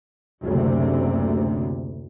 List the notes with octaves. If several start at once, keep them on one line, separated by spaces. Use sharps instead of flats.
F#1 D2 C3